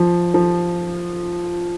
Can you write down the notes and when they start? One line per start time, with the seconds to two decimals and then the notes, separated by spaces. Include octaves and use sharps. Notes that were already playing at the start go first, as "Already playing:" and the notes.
Already playing: F3
0.34 F3